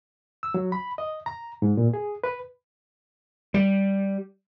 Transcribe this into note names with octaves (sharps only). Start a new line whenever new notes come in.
E6
F#3
B5
D#5
A#5
G#2
A#2
G#4
B4
G3